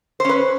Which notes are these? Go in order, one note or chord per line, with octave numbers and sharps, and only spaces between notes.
C#4 B4 C5